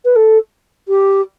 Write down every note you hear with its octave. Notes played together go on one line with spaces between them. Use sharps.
B4
A4
G4